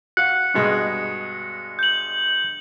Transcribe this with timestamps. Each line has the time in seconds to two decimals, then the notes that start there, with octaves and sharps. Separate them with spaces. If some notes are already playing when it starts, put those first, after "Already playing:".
0.17 F#4 F5 F#6 C#7
0.54 G2 B2 G#3
1.79 G6 F#7